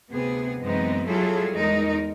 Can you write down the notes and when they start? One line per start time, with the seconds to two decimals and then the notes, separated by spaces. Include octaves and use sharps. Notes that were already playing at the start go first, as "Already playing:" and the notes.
0.10 D2 C3 B3 G#4
0.60 F#2 E3 G#3 B3 C4 D#4
1.06 F#3 G3 E4 F4 G#4 A4
1.54 E2 G#3 D#4 A#4